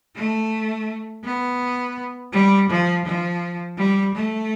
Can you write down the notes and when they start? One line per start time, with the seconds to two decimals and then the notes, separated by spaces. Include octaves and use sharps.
0.15 A3
1.23 B3
2.33 G3
2.69 F3
3.05 F3
3.77 G3
4.14 A3